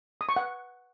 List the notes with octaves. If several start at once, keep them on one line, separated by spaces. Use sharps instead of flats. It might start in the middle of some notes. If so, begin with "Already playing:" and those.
D#6
C#6
F#5